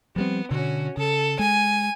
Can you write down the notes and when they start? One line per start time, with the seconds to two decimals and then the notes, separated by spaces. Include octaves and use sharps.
0.16 F3 G3 B3 C4
0.51 B2 D3 C#4 F#4
0.97 C#3 A4
1.39 G#3 G#5